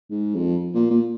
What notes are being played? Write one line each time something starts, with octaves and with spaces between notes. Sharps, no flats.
G#2
F2
A#2
A#2